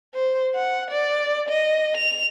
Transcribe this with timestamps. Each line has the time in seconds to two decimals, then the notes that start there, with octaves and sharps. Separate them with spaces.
0.15 C5
0.55 F#5
0.91 D5
1.49 D#5
1.97 F7